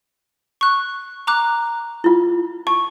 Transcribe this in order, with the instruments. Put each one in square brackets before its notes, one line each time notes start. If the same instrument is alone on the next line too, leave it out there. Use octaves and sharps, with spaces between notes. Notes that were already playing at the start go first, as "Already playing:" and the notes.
[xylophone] C#6 F#6
A#5 D6 F#6
[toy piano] E4 F4
[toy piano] A5 [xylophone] C#6